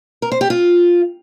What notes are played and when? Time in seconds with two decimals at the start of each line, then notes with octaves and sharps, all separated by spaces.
0.22 A#4
0.32 C5
0.41 G4
0.50 F4